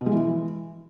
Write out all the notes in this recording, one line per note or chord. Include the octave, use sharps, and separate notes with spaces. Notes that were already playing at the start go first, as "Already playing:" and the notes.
B2
G#3
E3